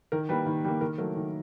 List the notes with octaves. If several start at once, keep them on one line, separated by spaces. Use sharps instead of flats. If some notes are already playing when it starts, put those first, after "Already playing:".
D#3 A#4
G3 A#3 B4
D#3
G3 A#3
D#3 A#4
F#3 A3 A#4
D#3